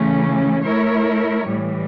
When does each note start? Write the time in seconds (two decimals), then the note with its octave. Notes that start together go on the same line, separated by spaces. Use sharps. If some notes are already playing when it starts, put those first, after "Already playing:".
Already playing: C#3 E3 A3 C#4
0.63 A3 E4 A#4 C#5
1.45 A2 E3 G3